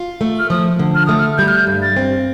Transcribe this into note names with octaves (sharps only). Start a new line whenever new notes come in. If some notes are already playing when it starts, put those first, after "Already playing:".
Already playing: F4
A3
F6
F3 D#6
D3
F6
A3 D#6
F6
G3 G6
F6
G6
G2
A6
C4